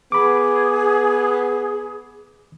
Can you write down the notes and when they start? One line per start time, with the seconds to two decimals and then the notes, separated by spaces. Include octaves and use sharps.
0.12 B3 G#4 B5 D6